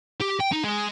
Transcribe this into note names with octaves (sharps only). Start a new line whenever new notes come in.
G4
G5
D#4
G#3